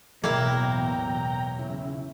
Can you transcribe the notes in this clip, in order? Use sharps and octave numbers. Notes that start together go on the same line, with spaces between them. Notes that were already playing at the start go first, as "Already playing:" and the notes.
A1 E2 B2 F#3 A#3 E4 G5 A#5
C#3 E4